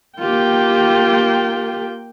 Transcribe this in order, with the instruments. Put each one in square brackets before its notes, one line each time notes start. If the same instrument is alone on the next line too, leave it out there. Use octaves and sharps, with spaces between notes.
[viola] A#3 G5 [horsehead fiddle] F4 G4